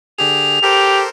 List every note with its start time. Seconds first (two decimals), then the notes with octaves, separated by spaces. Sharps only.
0.18 D3 G4 G#4 F7
0.63 G4 A4 A#4 C5